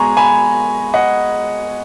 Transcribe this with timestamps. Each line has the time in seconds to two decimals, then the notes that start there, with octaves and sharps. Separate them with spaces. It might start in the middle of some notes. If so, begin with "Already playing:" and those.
Already playing: B2 G#3 G#5 A#5 C#6
0.17 G#5 B5
0.94 D#5 F#5